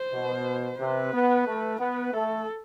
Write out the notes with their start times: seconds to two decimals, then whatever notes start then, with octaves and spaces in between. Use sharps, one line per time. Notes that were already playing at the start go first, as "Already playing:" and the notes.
Already playing: C5
0.13 B2
0.80 C3 B4
1.13 B3
1.47 A3
1.80 B3 B4
2.13 A3 A4